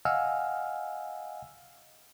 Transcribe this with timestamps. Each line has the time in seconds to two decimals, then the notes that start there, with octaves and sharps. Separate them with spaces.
0.05 D#5 F5 F#5 G#5 E6 F6